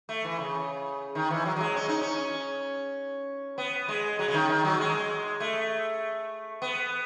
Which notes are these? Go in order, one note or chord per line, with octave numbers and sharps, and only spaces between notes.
A3
E3
C#3
D#3
E3
F#3
F#3
G#3
C#4
D#4
C#4
B3
G#3
F#3
C#3
D#3
D#3
F#3
G#3
A3
B3